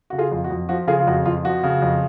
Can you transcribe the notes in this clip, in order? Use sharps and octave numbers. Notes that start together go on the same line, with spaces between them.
C#3 F#4
F4 G#4
F2
F#4
F2
F3 F#4
C#3 F4 G#4
F4
F2 F#4
F2 F4
F3 F#4
C#3
F2